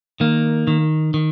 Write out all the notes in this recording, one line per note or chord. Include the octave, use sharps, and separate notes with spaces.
D#3 A#3
D#3
D#3